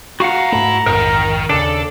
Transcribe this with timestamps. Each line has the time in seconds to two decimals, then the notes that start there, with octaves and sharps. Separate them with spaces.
0.20 E2 F#4 F5 F#5 A#5
0.52 G#2 A3 E4
0.86 A#1 F2 G#2 D#3 A#4
1.49 D#2 C#3 D4 A4